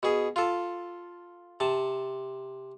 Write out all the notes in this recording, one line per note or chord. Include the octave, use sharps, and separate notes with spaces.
B2 G#4
F4 A4
C3 A5